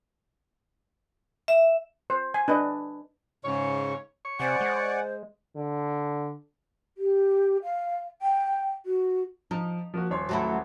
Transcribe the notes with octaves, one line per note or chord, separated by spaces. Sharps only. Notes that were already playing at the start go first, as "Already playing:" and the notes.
E5
C5
G#5
D4 B4 D#5
G#2 C#3 C#5
C#5 C#6
C3 C5 D5 F#5 G#5
G#3
D3
G4
F5
G5
F#4
F3 D#4
F3 A#3 F#4
D#1 C#5 C6
F#3 A3 E4